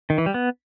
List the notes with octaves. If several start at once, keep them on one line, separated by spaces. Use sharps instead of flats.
D#3
E3
G3
B3